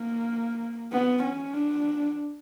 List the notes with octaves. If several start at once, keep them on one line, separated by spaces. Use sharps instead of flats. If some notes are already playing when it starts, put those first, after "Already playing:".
Already playing: A#3
B3
C#4
D4